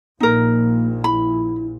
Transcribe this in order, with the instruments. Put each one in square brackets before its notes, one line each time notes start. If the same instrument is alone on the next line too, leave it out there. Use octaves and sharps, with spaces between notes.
[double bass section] A#1 A#2 [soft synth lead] A#3 [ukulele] D#4 A#4
[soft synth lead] E4 [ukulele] B5